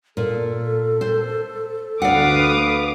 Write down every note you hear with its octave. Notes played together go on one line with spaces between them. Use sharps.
A#2 A4
C5
D2 B4 D5 F5 F#5 D6 D#6